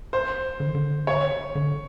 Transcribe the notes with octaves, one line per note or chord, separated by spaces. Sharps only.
C5
D3
D#3
D3
C#5
D3